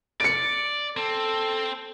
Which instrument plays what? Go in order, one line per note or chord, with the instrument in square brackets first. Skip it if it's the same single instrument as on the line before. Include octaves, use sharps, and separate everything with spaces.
[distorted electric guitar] D5 [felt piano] C#7 D7
[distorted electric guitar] C4 [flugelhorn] A4